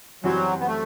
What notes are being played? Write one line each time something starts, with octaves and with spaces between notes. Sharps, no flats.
F#2 E3 F#3 G3 C4 F#4
B3
A3